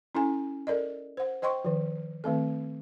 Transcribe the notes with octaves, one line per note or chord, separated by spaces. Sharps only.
C#4 E4 A4 G#5
A4 A#4 D5 D#5
C5 F#5
C5 D#5 G5 C6 C#6
D#3 F3
D#3 A3 C4 A4